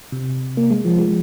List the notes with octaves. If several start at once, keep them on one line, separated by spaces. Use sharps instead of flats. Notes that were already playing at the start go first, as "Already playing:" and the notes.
C3
A#3
G#3
F3
G#3